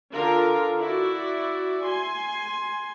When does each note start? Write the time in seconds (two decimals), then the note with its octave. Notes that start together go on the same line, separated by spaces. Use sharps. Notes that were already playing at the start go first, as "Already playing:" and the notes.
0.12 D3 F4 A#4
0.80 E4 F#4 D5
1.85 G#5 C6